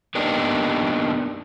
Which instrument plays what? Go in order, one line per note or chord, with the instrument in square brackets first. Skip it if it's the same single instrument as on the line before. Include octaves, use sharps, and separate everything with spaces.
[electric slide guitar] A#3 B3 D4 D#4 G4